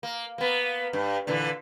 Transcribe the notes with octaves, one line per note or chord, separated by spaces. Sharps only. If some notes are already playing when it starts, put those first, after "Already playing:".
A#3
A#3 B3
G2
A#2 D3 E3